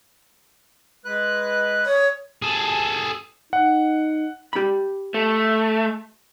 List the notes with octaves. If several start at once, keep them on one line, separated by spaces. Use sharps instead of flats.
G#3 B4 F#6
C#5 D#6
G#4 A4
D#4 F#5
G4 B5
A3